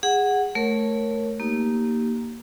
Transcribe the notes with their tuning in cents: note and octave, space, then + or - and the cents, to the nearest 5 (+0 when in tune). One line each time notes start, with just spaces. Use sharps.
G#4 -20 F#5 +0
A3 +0 A#4 +0 C#5 -10
A#3 +0 D#4 +0 G4 -15